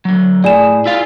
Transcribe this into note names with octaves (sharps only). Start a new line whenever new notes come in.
D3 F#3
A2 G#4 D5 G#5 E7
E4 F4 F5